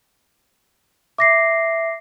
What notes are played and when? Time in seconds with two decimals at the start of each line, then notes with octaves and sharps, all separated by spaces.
1.18 E5 D6 A#6 C7